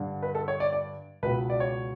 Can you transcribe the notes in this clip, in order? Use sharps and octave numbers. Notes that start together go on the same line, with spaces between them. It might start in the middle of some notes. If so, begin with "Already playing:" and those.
Already playing: G2 D3
B4
A4
C#5
D5
D5
C#2 B2 B4
D5
C#5